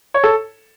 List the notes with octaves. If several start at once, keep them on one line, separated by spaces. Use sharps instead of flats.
C#5
A4